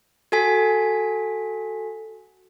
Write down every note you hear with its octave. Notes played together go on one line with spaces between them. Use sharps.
F#4 A4 G#5 B6